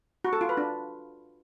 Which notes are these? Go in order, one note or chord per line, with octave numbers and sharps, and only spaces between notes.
F#4
A4
F4
B4
D4